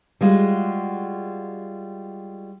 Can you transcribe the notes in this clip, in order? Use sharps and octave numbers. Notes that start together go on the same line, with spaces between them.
G3 G#3 F4 F#4